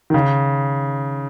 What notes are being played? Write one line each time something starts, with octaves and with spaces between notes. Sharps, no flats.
D#3
C#3